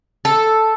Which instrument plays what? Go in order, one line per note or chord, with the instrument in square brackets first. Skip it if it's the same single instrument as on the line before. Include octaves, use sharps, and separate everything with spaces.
[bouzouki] A4